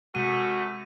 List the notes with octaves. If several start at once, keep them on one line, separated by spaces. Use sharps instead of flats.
F#2 C3 G#3 A3 F#4 D#7